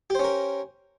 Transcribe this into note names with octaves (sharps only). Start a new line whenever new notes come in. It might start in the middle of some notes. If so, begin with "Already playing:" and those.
C#4 G4 A#4 C5